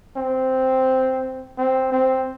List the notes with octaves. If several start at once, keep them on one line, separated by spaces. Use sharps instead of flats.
C4
C4
C4